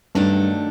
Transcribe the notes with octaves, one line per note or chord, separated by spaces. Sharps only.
G2 D#3 F#3 A3 D4